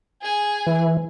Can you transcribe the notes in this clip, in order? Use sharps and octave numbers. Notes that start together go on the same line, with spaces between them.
G#4 G#5
E3